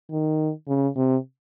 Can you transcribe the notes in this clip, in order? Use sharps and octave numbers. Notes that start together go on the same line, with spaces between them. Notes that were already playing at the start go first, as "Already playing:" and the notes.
D#3
C#3
C3